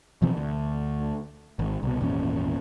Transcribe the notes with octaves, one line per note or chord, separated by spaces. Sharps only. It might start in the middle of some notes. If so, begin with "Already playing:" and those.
B2 E3 F3 C4
D2
G#1
C2 B2
G#1 E2 A#2 C#4